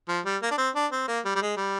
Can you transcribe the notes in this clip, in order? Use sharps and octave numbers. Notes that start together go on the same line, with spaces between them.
F3
G3
A#3
D4
C4
D4
C4
A#3
G3
G3
G#3
G3